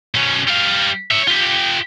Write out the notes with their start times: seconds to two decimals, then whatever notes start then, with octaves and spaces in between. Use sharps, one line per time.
0.14 B2 C#4
0.47 G3 F5
1.11 C#5 E5
1.28 F4 G4